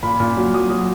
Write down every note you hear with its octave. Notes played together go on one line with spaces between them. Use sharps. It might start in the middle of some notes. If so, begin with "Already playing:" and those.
A#2 B5
A#2
F#3
F#3 D#6
F#3